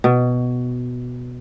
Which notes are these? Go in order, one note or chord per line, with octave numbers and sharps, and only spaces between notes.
B2